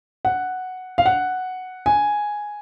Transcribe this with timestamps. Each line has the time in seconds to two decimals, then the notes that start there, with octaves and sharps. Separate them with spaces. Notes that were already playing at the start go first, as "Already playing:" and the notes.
0.25 F#5
0.98 F5
1.06 F#5
1.86 G#5